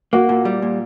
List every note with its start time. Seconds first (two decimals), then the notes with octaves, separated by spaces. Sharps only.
0.13 A#3 F#4
0.29 A#2
0.45 G3
0.62 A#2